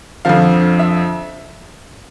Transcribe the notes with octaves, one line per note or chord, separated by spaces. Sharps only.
F2 D3 F3 F5
E5